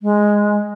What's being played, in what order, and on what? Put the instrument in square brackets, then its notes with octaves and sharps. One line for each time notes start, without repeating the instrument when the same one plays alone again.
[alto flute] G#3